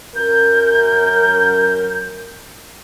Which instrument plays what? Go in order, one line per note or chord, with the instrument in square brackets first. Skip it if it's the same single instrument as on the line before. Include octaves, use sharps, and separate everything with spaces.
[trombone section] F#2 A#4 [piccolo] G6